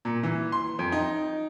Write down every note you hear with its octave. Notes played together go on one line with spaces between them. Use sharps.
A#2
E3
C6
F2
D#4